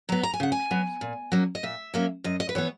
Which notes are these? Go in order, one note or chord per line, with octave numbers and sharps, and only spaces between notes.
F#3 B3 A#5
A#5
G#5
C#3 F#5
G#5
F#3 B3
A#2
F#3 A#3 C#4
D#5
A#2 E5
F#3 A#3 C#4
F#2 D#5
D#5
B4
E3 B3 C#5